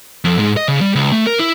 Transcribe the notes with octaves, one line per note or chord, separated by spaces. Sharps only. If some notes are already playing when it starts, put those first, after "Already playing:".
F2
G#2
D#5
C#3
G3
C#2
A3
A#4
E4